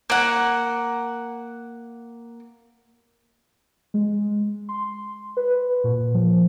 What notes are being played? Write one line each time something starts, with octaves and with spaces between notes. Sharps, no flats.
A#3 F#5
G#3
C6
B4
A#2
F3